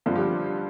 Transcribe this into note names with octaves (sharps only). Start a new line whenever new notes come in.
G2 D3 F3 F4
G4